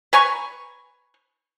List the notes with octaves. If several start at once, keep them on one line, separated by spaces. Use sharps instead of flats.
B4 G#5 A#5 C#6